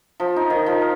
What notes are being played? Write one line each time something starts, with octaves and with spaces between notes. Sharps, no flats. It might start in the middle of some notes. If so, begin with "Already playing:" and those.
F3
D#4
D#3
F3
A#4